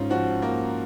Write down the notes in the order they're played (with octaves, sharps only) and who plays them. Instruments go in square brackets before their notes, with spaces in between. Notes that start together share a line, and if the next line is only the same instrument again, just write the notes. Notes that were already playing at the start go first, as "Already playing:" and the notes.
Already playing: [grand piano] G#2 C#4 F4
F3 F#4
A#3